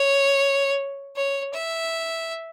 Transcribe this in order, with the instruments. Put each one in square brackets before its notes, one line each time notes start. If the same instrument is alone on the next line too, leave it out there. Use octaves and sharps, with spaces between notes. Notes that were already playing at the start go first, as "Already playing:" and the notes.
Already playing: [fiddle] C#5
C#5
E5